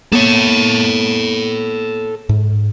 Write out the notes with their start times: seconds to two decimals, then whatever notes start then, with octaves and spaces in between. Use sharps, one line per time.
0.12 A#3 B3 A4 C#5
2.29 G#2